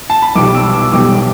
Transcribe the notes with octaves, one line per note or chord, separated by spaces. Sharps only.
A5
B5
B1 B2 G3 D6
E6
E6
B1 B2 G3 D6